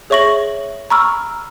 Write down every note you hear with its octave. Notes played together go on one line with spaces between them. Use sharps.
G#4 C#5 E5 C#6 A#6 F#7
A#5 B5 C#6 E6 F6